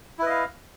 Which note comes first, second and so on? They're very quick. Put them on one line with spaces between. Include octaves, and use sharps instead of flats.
E4 B4 D#5 F5